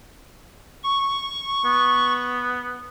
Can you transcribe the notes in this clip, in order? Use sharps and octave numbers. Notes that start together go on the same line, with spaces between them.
C#6
B3